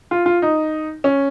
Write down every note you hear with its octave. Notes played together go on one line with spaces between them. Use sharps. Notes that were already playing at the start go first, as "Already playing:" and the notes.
F4
F4
D#4
C#4